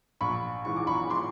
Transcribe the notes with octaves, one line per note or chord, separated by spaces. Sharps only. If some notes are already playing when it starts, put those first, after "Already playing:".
A#1 B5 C#6
G#2 E3 C#6
D6
B5 C#6
C6 D6